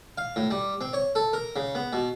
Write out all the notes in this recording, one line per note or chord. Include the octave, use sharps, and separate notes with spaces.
F5
A2
G3
C4
C#5
A4
A#4
C#3
B3
B2